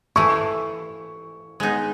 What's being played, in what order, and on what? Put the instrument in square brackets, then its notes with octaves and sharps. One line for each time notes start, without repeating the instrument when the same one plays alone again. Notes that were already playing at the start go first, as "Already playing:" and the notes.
[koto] E3 A3 E4 [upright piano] C#6
[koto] G#3 B3 D#4